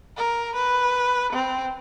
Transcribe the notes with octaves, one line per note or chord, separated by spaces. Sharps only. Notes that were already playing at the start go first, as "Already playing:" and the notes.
A#4
B4
C4